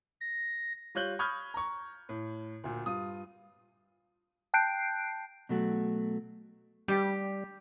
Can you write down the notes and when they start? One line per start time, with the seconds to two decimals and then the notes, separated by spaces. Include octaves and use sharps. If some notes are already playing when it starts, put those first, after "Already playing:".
0.21 A#6
0.95 G3 F4 C#5 F#6 G6 F#7
1.19 B5 C#6 D#6 F6 G6 G#6
1.54 A#5 C#6
2.09 A2
2.64 D2 A#2
2.86 G2 F4 D#6
4.54 G5 A5 F#6 G6 C7 D7
5.49 B2 F#3 A3 F#4
6.88 G3 G4